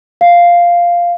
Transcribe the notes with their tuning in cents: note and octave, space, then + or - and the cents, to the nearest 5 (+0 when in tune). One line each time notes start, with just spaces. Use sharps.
F5 -5